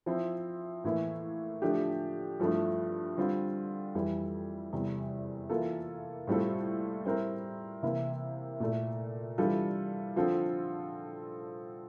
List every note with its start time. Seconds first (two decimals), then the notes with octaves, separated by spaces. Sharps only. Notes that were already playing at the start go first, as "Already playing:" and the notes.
0.06 F3 C4 E4
0.84 A2 E3 A#3 E4
1.62 D3 F3 A3 D4 G4
2.40 G2 F3 A3 E4
3.17 D3 G3 C4 F4
3.95 F2 E3 G3
4.72 E2 C3 G3
5.50 E3 A#3 F4 A4
6.27 A2 G3 C4 F4 A4
7.05 G3 C4 E4 A#4
7.83 C3 E3 A#3 E4
8.60 A#2 A3 E4 A4
9.38 E3 G3 D4 F4 A4
10.16 D3 F3 C4 F4 A4